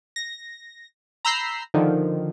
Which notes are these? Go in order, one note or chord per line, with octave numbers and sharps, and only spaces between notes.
A#6
A#5 B5 E6 G6 A#6 C7
D3 D#3 F3